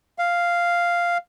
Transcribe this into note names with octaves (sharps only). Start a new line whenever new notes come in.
F5